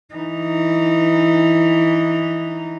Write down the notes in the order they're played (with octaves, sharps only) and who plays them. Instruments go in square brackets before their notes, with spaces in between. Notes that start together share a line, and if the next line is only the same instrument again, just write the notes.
[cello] E3 D#4